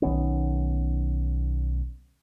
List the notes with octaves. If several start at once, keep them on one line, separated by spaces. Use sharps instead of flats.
B1 D#3 B3 C#4